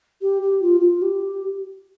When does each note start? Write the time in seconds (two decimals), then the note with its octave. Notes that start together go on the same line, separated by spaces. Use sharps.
0.21 G4
0.42 G4
0.62 F4
0.81 F4
1.02 G4